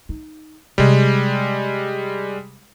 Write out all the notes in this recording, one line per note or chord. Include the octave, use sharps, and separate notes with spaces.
D#4
C3 G3 G#3